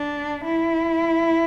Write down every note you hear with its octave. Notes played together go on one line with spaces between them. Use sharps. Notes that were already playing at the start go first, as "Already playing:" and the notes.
Already playing: D4
E4